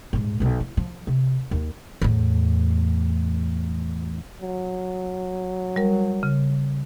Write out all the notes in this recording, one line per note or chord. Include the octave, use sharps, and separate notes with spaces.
D#1 G#2
B1 B2
E4
F3
C3
D#2
E2 A2
F#3
G3 A#4
C#3